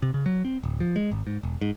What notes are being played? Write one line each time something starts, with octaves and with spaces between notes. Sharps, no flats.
C3
C#3
F#3
C4
D1
F3
G#3
G#1
G#2
E1
G#2